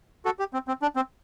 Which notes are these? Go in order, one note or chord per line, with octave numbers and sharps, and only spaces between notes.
F#4 A4
G4
C4
C4
D4
C4